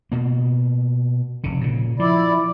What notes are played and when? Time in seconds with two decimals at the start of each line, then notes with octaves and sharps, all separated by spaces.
0.12 B2 A#3
1.44 F1 C#3
1.61 A#2 C#3
1.99 F3 E4 D5